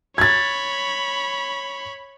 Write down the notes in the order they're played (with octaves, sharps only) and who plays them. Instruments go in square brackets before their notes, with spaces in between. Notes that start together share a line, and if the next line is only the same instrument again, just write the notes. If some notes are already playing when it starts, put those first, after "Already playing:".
[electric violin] C#5 B5 [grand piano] G#6 A6